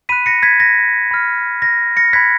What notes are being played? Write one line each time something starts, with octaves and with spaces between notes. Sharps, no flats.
B5 F#6 B6 D#7
A#6 C#7
G#6 B6
A#6
B5 F6
A#6
A#6 C#7
B5 F#6 G#6 B6